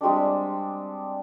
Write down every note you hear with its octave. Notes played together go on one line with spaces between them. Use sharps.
G3 G#3 C4 D4